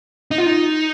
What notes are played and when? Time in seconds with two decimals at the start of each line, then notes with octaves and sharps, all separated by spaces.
0.31 D#4
0.38 F4
0.46 D#4